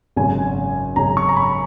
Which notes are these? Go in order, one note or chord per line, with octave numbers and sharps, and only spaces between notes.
G#1 F#2 C#3 G#5
G#1 F#2 C#3 A#5
C#6
A#5
B5